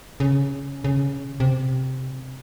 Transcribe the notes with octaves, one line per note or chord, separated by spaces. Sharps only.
C#3
C#3
C3